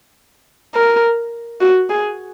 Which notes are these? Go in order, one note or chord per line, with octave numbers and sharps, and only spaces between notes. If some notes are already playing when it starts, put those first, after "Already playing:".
A#4
F#4
G#4